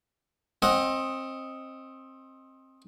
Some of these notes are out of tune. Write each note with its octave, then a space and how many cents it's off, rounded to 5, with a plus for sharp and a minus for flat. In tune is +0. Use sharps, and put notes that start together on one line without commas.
C4 +25 D#5 +5 F#5 +0